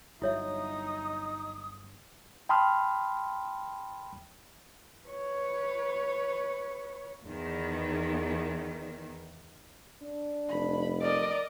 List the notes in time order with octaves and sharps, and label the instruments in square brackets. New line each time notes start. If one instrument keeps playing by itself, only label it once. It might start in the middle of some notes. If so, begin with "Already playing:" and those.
[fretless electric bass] G1 F#3 [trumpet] D#4 [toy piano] E4 C#5 E5 [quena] D#6
[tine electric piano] G5 A5 B5 C6 D#6 F6
[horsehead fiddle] B4 C#5
[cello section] E2 D#3
[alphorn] D4
[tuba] F1 [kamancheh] B5
[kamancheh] A#4 D#5 [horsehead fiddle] D5